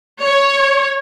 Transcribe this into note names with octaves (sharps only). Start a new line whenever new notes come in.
C#5